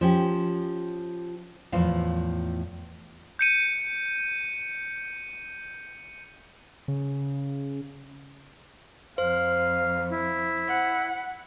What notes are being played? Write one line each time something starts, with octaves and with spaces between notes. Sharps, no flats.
F3 C#4 G4
E2 A2 F3 F5
G6 C#7 D#7
C#3
F2 C5 F5
E4
F#5